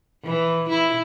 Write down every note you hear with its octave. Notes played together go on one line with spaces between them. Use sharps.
E3
E4